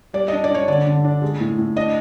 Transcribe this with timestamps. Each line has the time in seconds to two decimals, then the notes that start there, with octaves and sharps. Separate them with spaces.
0.14 G3 D5
0.28 D#5
0.33 D4
0.44 D5
0.50 D4 C#5
0.67 D3 D5
0.86 D3
1.04 D4
1.22 G#3
1.40 A2
1.58 A2
1.76 D4 D#5